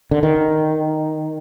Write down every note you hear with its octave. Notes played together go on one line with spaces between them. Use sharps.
D3
D#3